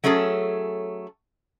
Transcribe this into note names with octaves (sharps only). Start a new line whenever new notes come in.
F#3 A3 C#4 G#4 A4